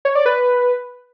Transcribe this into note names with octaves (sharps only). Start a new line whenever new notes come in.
C#5
D5
B4